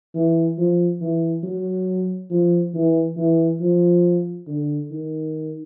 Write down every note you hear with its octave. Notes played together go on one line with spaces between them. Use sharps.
E3
F3
E3
F#3
F3
E3
E3
F3
D3
D#3